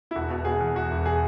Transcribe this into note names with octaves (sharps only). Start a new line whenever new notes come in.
E4
E1 F#4
B2
B2 G#4
E2
E2 F#4
E1
G#4